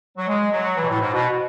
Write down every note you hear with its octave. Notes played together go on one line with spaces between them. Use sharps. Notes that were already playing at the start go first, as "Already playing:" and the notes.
F#3
G#3
F#3
E3
B2
A2
G#2
B2